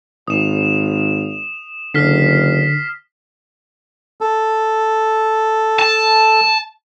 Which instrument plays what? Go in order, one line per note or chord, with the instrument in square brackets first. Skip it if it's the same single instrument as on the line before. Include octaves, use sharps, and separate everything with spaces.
[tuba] G#1 [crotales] D#6 E7
[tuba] F#1 [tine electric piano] D3 [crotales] F6 B6 C7
[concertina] A4
[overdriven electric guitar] A5